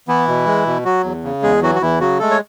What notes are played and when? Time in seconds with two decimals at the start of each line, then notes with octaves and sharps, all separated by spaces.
0.08 E3 B3 E4
0.28 B2
0.46 G#3
0.67 B2
0.85 F#3 F#4
1.04 E2
1.24 C#3
1.42 E2 G#3 G#4
1.62 E3 F#3 F#4
1.75 F#4
1.82 E2 E3 E4
2.00 C#3 F#3 F#4
2.20 G#3 A3 A4
2.31 C#5